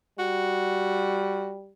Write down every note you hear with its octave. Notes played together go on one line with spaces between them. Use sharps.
G3 F#4